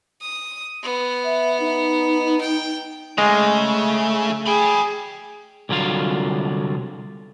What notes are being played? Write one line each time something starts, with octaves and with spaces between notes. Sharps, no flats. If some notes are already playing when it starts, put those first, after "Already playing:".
D#6
B3
E5
D#4
G5
C#3 G#3 A3 D#5
G#4 G5 B5
C2 D3 F#3 F4 F5